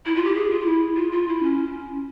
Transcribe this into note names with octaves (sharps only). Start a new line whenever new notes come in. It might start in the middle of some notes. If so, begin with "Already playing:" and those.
E4
F4
G4
G#4
F4
F4
E4
F4
F4
E4
C#4